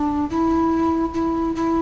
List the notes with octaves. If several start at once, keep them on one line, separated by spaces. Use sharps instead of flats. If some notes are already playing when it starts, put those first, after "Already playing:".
Already playing: D4
E4
E4
E4